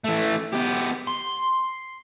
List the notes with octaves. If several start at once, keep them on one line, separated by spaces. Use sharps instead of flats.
E3 A3
B3 G4
C6